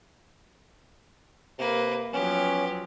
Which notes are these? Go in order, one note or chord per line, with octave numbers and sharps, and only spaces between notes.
C3 A#3 B4
F3 F#3 B3 C#4 G4